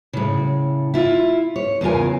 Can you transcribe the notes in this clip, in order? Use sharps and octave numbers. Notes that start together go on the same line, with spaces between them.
A2 C#3
E4 F4
C#5
E2 C#3 F4 A#4 G#5